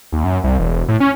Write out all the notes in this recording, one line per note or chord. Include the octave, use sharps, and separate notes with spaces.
D#2
F#2
C2
E1
A2
C#4